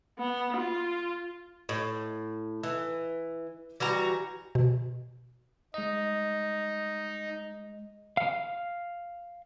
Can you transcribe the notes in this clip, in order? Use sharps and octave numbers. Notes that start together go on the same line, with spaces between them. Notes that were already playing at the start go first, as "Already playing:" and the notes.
B3
F4
A2
E3
E3 G3 F#4 A#5
B2
G#3 D#4 D#5
F5